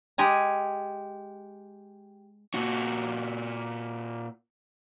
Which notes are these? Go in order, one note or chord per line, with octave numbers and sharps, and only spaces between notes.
G#3 G4 G#5 A#5
A#2 F#4